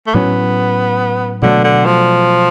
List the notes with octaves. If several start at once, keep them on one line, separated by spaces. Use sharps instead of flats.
A3
A2 F#3 B3 C#4
B2 D3 F#3 A3
D3
F3